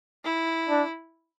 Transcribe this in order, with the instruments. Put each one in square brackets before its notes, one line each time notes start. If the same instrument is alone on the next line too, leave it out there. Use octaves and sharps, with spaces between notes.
[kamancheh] E4
[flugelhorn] D4